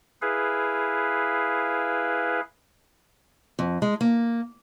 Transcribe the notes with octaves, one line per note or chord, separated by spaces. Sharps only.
E4 G#4 B4 F5
F2
G#3
A#3